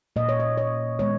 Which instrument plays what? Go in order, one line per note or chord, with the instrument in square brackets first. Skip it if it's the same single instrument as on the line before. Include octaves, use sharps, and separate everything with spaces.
[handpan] A#2 A#3 D#5
C#5
D#5
C#5
D#3 G#3 B3 C#5